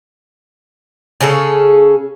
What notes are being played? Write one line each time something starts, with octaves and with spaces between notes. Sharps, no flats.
C#3 C#4 G#4 A4